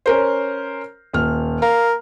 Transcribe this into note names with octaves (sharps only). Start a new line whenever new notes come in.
C#4 A#4 C5
D#1 F6
A#4 F5